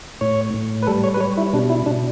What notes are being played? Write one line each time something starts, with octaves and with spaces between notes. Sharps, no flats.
A2 C#5
A2
B4
G3 A4
C#5
B4
G3 C#5
E4
B2 D4
E4
B2 D4